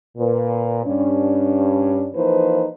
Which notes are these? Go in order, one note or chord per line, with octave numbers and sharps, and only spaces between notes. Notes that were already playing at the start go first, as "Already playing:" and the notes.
A#2 B4
G2 C#4 D4
E3 F3 A#3 D#4 B4 C5